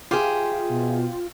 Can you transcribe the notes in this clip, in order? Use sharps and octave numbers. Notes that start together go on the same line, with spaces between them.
F4 G4 G#4 C5 E5
B2